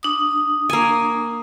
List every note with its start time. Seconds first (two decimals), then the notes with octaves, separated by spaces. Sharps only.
0.03 D4 D#6
0.69 A#3 G#5